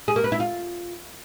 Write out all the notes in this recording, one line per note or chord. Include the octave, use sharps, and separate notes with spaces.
G#4
A#3
B4
E4
F4